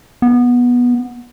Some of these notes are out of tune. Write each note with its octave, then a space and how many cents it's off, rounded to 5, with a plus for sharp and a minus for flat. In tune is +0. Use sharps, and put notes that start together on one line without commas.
B3 -15